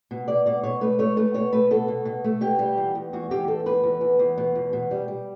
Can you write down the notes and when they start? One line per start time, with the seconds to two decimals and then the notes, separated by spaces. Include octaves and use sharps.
0.11 B2
0.28 B2 D5
0.46 B2 D5
0.63 B2 C#5
0.81 A3 B4
0.99 A3 C#5
1.17 A3 B4
1.34 B2 C#5
1.52 A3 B4
1.71 B2 A4
1.88 B2
2.05 B2
2.24 A3
2.41 B2 G4
2.59 G3
2.78 E2
2.95 E2
3.13 E2 F#4
3.31 E2 G4
3.48 E2 A4
3.66 E2 B4
3.84 E2
4.01 E2
4.19 E2
4.38 B2
4.55 E2
4.73 B2
4.91 G3
5.08 G3